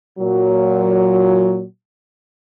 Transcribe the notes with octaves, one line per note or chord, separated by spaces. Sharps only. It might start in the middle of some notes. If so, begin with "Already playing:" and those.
A#2 F#3